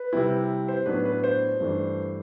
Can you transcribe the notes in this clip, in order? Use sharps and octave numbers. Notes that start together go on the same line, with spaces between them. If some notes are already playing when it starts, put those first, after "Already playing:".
Already playing: B4
C3 G3 C4 E4
C5
A2 F#3 B3 D4 B4
B4
C5
G2 E3 A3 D4